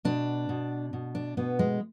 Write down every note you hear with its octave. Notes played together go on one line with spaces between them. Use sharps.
B2 D4
B2
B2
D4
B2 B3
G#3